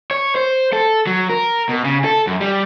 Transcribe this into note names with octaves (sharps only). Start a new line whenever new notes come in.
C#5
C5
A4
F#3
A#4
B2
C#3
A4
F#2
G3